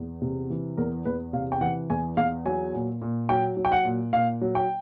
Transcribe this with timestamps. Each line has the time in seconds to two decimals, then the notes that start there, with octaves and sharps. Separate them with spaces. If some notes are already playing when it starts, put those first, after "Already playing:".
Already playing: E2
0.22 C3
0.50 E3
0.77 E2 A#4
1.05 E2 B4
1.33 C3 F5
1.52 G5
1.61 E3 F#5
1.90 E2 G#5
2.17 E2 F5
2.45 F#3 G#5
2.74 A#2
3.02 A#2
3.29 F#3 G5
3.57 F#3
3.65 G5
3.72 F#5
3.85 A#2
4.13 A#2 F5
4.41 F#3
4.55 G5